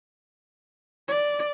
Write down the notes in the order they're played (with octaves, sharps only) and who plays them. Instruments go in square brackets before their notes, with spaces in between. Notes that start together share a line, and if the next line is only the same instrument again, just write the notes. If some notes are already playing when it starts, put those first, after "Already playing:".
[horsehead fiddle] D5